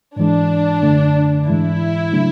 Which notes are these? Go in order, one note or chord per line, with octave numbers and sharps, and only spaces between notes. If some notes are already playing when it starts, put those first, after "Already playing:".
G#2 E3 G#3 D4
F#2 D3 A3
G#2 E3 G#3 E4
C#3 F#3 A3 D4